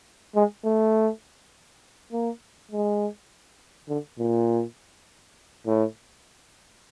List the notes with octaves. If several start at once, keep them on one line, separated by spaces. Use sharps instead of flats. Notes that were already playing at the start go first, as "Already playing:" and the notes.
G#3
A3
A#3
G#3
D3
A#2
A2